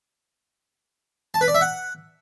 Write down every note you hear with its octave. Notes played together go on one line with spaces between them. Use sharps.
A5
B4
D5
E5
F#5